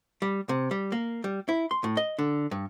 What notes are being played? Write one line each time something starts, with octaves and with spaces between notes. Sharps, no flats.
G3
C3
G3
A#3
G3
E4
C6
A2
D#5
D3
G2